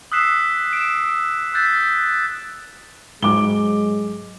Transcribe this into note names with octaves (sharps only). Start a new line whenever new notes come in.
D#6 E6 F#6 B6 C7 E7
D7 E7
E6 F#6 G6 A6 B6
G#2 F#3 G#3 D6 G7